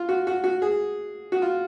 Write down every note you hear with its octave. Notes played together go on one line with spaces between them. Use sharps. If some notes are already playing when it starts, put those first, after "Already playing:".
Already playing: F4
F#4
F#4
F#4
G#4
F#4
F4